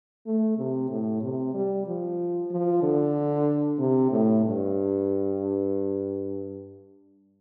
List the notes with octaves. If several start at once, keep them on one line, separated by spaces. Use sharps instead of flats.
A3
C3
A2
C3
G3
F3
F3
D3
C3
A2
G2